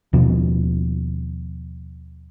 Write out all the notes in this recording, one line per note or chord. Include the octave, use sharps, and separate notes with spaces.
D#2 B2 F3 B3